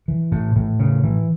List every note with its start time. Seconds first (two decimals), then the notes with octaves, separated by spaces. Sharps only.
0.08 E3
0.32 A2
0.56 A2
0.79 C#3
1.04 E3